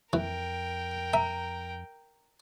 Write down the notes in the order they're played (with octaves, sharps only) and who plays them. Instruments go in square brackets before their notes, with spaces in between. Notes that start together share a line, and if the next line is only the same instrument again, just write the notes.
[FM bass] F2 [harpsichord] E3 [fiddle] A#4 G5
[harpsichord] E5 [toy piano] A#5